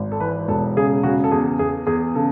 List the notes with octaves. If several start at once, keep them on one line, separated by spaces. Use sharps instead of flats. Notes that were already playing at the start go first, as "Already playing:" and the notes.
Already playing: G#1
A4
E3 B4
E1 A4
C#3 G#4
C#3 F#4
A4
E2 G#4
E2 G#4
E2 G#4
C#3 A4